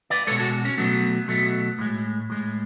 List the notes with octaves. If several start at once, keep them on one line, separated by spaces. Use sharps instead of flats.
B4 D5
B2 G#3 A4 C#5
F#4 A4
C#4
B2 F#3 A3 B3
B2 F#3 A3
A2 G#3
A2 G#3